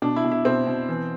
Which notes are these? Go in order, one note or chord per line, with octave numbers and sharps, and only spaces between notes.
B2 D4
E4
B2
E4
B2 C4
B2
E3